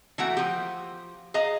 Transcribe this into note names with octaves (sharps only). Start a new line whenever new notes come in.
E3 A3 A#3 F#4 F#5 A#5
F3 G4
G#4 D#5 F5 A#5